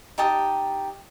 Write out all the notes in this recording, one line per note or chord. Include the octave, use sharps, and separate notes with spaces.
D#4 G4 A5 D#6